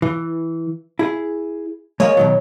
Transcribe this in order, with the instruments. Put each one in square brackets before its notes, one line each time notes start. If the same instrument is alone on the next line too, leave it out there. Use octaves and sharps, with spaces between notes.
[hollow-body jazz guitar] E3
E4 G#4
[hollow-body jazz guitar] G#3 A#3 D#5 [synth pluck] C#5
[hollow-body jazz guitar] B2 D#3 F#3